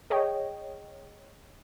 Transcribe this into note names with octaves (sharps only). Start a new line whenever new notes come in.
G#4 C#5 D#5 G5